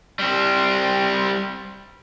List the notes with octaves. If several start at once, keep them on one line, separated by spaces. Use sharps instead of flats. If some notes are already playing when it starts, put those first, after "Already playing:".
G3 C4